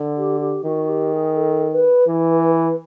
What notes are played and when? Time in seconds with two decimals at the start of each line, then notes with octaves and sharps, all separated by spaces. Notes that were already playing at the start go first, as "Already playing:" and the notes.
Already playing: D3
0.16 G4
0.40 G4
0.64 D#3 F#4
0.88 G4
1.12 G#4
1.35 A4
1.72 B4
2.07 E3
2.31 B4
2.54 B4